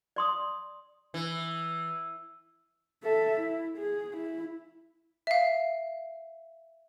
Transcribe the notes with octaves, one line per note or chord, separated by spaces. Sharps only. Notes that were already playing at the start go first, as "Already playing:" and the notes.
D5 C6 D#6
E3
A4 E5
E4
G#4
E4
E5 F5